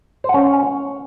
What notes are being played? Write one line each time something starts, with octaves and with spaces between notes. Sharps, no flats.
C5
F#5
C#4